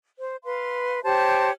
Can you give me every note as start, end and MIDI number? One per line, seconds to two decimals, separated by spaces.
0.18 0.36 72
0.44 1.02 71
0.44 1.02 77
0.44 1.02 84
1.03 1.51 67
1.03 1.51 72
1.03 1.51 73
1.03 1.51 81